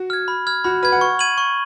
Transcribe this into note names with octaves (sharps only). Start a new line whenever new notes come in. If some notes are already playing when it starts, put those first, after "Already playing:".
Already playing: F#4
F6 G#6
B5
F6 G#6
F#4 B5
B4 F6 G#6
F#5
C#6
G#6 D#7 F#7
C#6